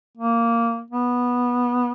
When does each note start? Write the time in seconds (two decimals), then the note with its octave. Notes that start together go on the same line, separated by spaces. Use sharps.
0.17 A#3
0.90 B3